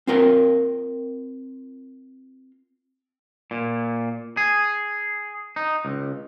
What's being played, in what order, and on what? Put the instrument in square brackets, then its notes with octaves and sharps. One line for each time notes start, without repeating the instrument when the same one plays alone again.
[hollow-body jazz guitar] C4 F4 A#4 G5
[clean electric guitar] A#2
G#4
D#4
C#2